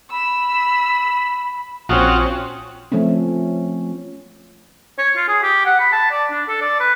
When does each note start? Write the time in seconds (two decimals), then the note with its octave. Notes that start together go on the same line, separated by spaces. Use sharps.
0.11 B5 E6
1.89 A#1 C4 C#4 F4 F#4 D#6
2.92 F3 A3 C4 C#4
4.98 C#5
5.16 F4
5.28 G#4
5.42 G4
5.66 F#5
5.79 B5
5.92 A5
6.11 D5
6.31 D4
6.48 A4
6.61 D5
6.80 B4